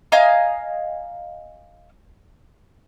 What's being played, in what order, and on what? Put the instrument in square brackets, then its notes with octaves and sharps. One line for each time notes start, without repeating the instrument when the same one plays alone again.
[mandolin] D#5 F5 G#5 A#5